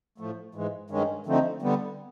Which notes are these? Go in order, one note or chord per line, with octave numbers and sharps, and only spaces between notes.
A2 F3 A3
G#2 E3 G#3
G2 D#3 G#3 C#4
D3 F3 A3 C4 D#4
D3 G3 B3